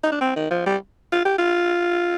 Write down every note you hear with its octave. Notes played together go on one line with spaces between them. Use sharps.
D#4
D4
C4
D#3
F3
G3
F4
G4
F4